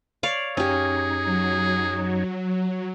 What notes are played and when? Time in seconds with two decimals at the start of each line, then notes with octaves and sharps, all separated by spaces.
0.23 C#5 D5 F5
0.57 F#2 C#4 D#4 G4 G#4 C#5
1.25 F#3